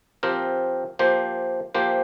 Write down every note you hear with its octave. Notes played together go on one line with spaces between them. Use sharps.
F3 C4 G4 A#4
F3 A#3 G4 C5
F3 A#3 G4 C5